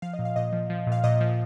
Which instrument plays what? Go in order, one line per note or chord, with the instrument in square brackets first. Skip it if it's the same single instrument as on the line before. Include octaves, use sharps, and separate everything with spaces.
[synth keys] F3 F5
D#5
A#2
F5
A#2 D#5
F3
F3
A#2
F5
A#2 D#5
F3